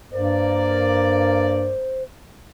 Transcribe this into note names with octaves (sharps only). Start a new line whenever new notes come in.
G2 A#3 C5 D5